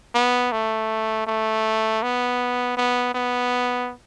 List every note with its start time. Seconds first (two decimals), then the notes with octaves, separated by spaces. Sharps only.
0.15 B3
0.52 A3
1.27 A3
2.03 B3
2.77 B3
3.15 B3